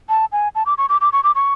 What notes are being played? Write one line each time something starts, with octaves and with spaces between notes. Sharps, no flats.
A5
G#5
A5
D6
C#6
D6
D6
C#6
D6
C#6